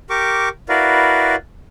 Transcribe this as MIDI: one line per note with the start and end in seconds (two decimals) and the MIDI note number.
0.10 0.49 67
0.10 0.49 70
0.10 0.49 85
0.10 0.49 86
0.69 1.35 64
0.69 1.35 66
0.69 1.35 70
0.69 1.35 71
0.69 1.35 74
0.69 1.35 77